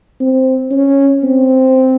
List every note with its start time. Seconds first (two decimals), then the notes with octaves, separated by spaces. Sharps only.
0.20 C4
0.71 C#4
1.23 C4